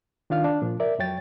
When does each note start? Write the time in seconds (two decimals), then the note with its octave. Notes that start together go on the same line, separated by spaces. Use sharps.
0.30 D#3 D4 F4 F5 F6
0.44 D4
0.62 A#2 F3
0.80 A#4 D5 E5
0.99 F2 F#3 C#5 G5 A6